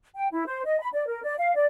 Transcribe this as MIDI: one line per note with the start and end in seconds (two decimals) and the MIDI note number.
0.15 0.27 79
0.32 0.47 64
0.47 0.63 72
0.65 0.79 75
0.81 0.88 83
0.93 1.07 74
1.07 1.22 70
1.23 1.34 74
1.38 1.55 77
1.55 1.65 74